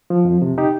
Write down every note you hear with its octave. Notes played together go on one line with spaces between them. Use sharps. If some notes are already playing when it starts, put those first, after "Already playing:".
F3
F2
C3
D#4 G4